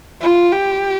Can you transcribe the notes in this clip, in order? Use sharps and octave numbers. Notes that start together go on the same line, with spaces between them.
F4
G4